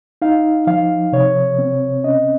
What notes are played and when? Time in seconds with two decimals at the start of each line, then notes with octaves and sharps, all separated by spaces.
0.22 D#4 F5
0.67 F3 F5
1.12 C3 C#5
1.59 C4
2.04 C#4 D#5